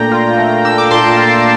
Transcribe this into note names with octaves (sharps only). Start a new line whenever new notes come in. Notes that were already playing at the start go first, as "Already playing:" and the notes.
Already playing: A#2 A3 D4 G5 A#5
F4
A3
D4 E6
D6
A#2 A5 C6
F4